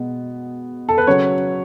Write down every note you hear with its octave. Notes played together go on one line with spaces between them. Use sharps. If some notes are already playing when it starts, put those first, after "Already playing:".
Already playing: B2 G#3 B3
A4
B4
C#3 F#3 C#4 C#5